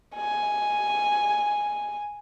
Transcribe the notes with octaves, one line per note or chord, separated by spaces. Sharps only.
G#5